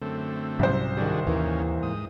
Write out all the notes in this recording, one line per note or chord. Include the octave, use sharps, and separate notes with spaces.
F#2 D3 A3 C4
C2 G#2 F#3 C#4 C5
D#3 G3 D4 F#4 G#4
D#2 D#3 E3 A#3 C#4
G#2 D#6